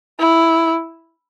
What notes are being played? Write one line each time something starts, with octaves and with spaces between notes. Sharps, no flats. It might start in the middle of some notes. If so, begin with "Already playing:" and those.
E4